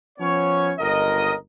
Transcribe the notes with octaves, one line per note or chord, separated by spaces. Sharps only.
F3 B3 C#4 C#5
G1 C#2 A#4 D#5